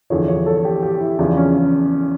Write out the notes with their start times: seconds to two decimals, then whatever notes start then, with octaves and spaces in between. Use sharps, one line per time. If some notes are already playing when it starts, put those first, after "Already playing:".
0.10 E2 D3 F3 C#5
0.28 C#5
0.46 A4
0.65 G4
0.83 G4
1.01 E4
1.19 E2 C#3 F3 D4
1.37 C#4